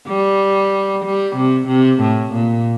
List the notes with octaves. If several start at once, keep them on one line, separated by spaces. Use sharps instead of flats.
G3
G3
C3
C3
A2
A#2